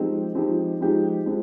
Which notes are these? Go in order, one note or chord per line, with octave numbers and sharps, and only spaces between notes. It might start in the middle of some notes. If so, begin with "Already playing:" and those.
Already playing: F3 G#3 C4 D#4 G4
F3 G#3 C4 D#4 G4
F3 G#3 C4 D#4 G4
F3 G#3 C4